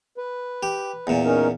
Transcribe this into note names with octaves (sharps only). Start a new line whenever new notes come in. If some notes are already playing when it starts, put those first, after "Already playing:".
B4
G4
E2 A#2
C#4 D#4 A#4